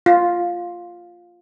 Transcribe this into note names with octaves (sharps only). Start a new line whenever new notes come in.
F4